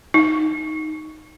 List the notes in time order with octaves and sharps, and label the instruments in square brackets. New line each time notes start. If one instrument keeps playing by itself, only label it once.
[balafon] D#4